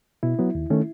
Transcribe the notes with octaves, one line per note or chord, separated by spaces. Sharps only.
B2 E4
F#3 B3
D#2
D#3 A3 C#4